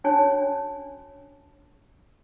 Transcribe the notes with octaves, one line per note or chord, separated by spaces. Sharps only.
C#4 D4 F#4 C#5 G#5 A5